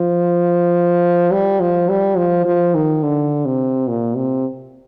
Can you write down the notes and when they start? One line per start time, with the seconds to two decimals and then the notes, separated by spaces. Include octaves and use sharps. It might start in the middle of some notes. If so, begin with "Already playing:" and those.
Already playing: F3
1.31 G3
1.60 F3
1.89 G3
2.17 F3
2.45 F3
2.75 D#3
3.03 D3
3.45 C3
3.88 A#2
4.15 C3